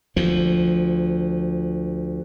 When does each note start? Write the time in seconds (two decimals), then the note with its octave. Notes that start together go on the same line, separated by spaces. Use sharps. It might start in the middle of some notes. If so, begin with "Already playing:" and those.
0.16 D2 F3